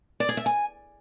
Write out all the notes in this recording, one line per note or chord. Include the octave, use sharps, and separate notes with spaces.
D5
G#4
E5
G#5